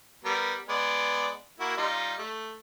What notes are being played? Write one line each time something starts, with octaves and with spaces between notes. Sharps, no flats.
G3 B3 A#4
G#3 B3 D5
A#3 E4 F#4
G3 D#4 F4
A3